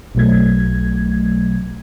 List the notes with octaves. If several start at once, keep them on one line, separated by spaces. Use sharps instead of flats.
B1 B2 F#3 A3 G#6